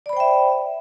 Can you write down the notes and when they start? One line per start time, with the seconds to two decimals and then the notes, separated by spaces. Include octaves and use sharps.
0.06 D5
0.09 B5
0.13 C5
0.17 G5
0.20 E5